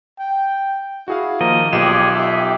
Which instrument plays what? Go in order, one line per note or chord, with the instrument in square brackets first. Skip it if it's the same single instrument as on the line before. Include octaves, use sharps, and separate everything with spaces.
[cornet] G5
[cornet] E4 [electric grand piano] F#4 G#4 F5
[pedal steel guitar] D#3 A#4 D#5 [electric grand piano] F3 [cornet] A#3
[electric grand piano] B1 F4 E7 [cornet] G4 [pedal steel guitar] G#4 D5
[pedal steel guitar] G4 [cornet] E5